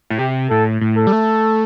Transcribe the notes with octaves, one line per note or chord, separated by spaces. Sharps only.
A2
C3 G4
A2 A4
A2
A4
G3
A3